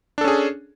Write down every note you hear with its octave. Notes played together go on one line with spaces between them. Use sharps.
C#4 D4 G#4 A4